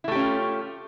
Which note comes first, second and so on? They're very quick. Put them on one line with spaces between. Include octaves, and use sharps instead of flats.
E4 A3 G4 C#4 F4